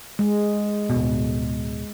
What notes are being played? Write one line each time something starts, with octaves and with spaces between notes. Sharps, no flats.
G#3
D1 B2